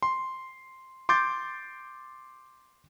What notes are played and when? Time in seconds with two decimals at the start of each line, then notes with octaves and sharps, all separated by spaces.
0.02 C6
1.09 C6 D6 G6 A6